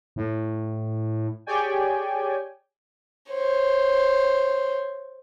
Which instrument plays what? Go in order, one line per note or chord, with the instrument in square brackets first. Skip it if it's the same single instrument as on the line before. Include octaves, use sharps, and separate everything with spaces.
[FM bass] A2
[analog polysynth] G4 G#4 C#5 D5 G5 G#5
[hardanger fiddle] C5 C#5